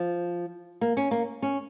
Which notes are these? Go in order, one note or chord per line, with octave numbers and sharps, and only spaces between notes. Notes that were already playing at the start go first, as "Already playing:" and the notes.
Already playing: F3
A#3
C#4
A#3
C#4